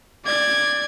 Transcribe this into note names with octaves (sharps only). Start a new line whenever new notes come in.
D5 G#6